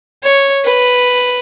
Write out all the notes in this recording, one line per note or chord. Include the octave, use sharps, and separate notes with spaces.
C#5
B4